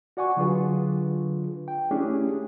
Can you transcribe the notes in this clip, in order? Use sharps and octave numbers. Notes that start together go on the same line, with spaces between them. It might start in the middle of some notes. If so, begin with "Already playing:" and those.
F#4 D5 F#5 G#5 C#6
D3 F#3 D4 F4 G#4 B4
G5
A3 C#4 D4 E4 G4 G#4